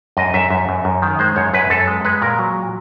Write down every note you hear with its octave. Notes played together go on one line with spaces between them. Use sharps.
F#2 D#5
F#2 E5
F#2
F#2
F#2
D#3
G#3 C5
F#2 C#5
F#2 B4
F#2 A4
G#3
G#3 B4
A#2 A#4
F#3